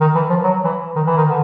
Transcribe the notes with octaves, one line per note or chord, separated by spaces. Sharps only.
D#3
E3
F3
F#3
E3
D#3
E3
D#3
D3